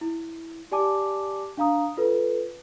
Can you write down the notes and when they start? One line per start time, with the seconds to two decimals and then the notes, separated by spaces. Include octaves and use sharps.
0.01 E4
0.72 G4 D5 G#5 A5 D6
1.57 D4 F5 A#5 D#6
1.97 F4 A4 B4